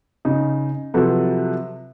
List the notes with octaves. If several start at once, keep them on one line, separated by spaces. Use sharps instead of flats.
C#3 D#4
C3 F3 F#3 A4 B4